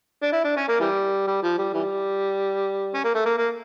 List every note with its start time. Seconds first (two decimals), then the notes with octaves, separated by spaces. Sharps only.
0.22 D4
0.32 E4
0.44 D4
0.56 C#4
0.68 A#3
0.80 E3 G3
1.27 G3
1.42 F3
1.58 G3
1.74 E3 G3
2.94 C#4
3.04 A#3
3.15 A3
3.26 A#3
3.38 A#3